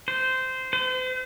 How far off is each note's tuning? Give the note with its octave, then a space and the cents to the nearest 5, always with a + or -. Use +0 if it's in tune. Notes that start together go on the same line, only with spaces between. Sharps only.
C5 -15
C5 -40